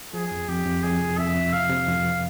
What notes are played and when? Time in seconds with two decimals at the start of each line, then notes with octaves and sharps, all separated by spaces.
0.13 F3 G#4
0.31 F2
0.48 F2 G4
0.66 F2
0.83 F2 G#4
1.00 C3
1.18 F2 E5
1.35 F2
1.53 C3 F5
1.70 C3
1.88 F2
2.05 F3